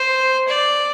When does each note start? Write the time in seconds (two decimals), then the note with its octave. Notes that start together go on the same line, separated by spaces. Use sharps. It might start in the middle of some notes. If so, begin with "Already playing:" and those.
Already playing: C5
0.48 D5